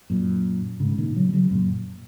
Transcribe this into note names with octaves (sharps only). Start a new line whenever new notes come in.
F#2 A#2
G#2 C#3
A#2 D#3
C#3 F#3
C#3 F#3
F#2 A#2